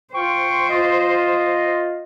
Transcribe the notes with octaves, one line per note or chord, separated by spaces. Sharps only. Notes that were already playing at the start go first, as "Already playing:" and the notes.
F4 C5 G5 C#6
F4 D#5